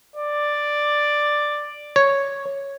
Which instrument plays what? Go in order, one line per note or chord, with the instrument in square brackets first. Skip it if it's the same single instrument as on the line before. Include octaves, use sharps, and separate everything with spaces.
[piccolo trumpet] D5
[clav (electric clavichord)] C#5